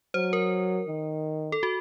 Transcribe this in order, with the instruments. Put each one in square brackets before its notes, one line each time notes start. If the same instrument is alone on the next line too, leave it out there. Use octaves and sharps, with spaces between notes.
[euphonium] F#3 [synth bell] C5
[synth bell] A#4
[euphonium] D#3
[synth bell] A4
F#4